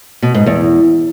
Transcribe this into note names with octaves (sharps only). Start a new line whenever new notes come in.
B2
G#2
E2